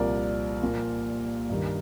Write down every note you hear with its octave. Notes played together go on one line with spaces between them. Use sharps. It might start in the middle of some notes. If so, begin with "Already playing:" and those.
Already playing: C2 A#2 F3 A#4 D5
A#2 F3 A#3 F4
G2 D#3 G3